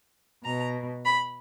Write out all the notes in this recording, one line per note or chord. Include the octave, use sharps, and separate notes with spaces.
B2 A#5
B5